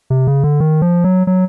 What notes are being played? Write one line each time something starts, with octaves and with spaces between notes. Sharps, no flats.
C3
C#3
D3
D#3
F3
F#3
F#3